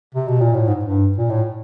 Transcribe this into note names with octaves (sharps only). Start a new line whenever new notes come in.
C3
B2
A#2
A2
G#2
G2
A#2
A2